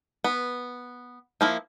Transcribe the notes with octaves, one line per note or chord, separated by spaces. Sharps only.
B3
F3 A#3 E4